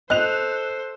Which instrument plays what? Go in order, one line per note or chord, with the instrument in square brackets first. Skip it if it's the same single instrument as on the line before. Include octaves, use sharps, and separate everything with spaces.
[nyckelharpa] A4 C5 [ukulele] D#5 [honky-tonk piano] F#6 F7